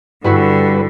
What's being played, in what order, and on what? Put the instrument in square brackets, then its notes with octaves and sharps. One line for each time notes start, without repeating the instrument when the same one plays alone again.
[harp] G2 E4 F#4 [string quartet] D3 [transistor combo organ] G3 B4